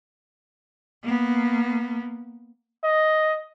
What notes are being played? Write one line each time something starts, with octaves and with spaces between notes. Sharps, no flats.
A#3 B3
D#5